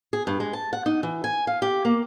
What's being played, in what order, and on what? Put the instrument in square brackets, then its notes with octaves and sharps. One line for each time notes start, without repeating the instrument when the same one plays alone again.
[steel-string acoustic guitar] G#4
G2
G#3
A5
F#5
D#4
E3
G#5
F5
G4
A#3